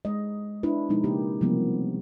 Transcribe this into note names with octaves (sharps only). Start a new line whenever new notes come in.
G#3 D#5
D4 E4 B4
B2 F3 G#3 D#4
C#3 A#3 G4
C3 E3 F3 G3 A#3 B3